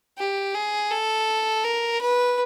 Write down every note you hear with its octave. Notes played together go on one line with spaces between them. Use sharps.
G4
G#4
A4
A#4
B4